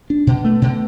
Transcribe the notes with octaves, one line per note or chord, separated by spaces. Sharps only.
D4
B2
A3
B2